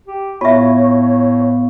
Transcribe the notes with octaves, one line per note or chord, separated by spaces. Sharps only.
G4
A2 B3 F4 C#5 E5 F5 C#6